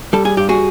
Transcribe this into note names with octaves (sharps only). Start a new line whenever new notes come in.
G3 A4
G#4
G2 G4
F#4 G#4